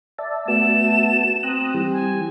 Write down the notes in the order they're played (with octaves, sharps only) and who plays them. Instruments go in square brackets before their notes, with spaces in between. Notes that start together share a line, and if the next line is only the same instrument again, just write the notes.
[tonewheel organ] D5 E5 A5
[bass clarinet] A3 [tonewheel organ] B3 F#4 A5 [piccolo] E7
[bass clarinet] C4 [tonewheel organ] A#5 D#6 F#6
[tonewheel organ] E3 G3
[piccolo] G#5